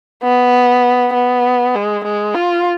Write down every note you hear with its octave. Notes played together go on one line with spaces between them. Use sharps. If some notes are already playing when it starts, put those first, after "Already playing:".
B3
B3
G#3
G#3
F4